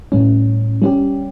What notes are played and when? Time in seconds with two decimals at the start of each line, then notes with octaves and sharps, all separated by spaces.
0.12 A2 G3 C#4
0.82 G3 C#4 G4